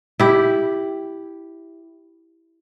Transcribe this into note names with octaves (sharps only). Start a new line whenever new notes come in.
E4 G4